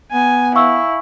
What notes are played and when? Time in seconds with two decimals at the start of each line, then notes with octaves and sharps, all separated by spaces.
0.12 B3 G#5
0.55 E4 F5 C#6 E6